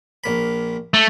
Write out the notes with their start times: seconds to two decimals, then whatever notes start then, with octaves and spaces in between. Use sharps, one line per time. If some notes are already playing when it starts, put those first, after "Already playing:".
0.24 A#1 A#3 B5
0.94 A3